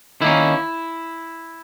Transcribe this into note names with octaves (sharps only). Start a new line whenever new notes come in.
D#3 A#3 C#4 E4